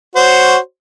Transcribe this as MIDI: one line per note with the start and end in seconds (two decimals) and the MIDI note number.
0.16 0.57 66
0.16 0.57 72
0.16 0.57 73